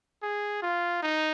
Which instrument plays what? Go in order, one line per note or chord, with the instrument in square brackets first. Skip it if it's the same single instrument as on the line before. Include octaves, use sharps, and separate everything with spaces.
[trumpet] G#4
F4
D#4